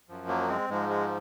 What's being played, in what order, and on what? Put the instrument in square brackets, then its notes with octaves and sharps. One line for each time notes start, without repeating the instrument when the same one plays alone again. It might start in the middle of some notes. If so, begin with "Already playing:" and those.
[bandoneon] F#2 F3
F#3 A#3
G#3 C4
G#2 F3 G#3
G#3